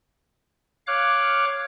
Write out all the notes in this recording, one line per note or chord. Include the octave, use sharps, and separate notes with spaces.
C#5 F5 D6 F#6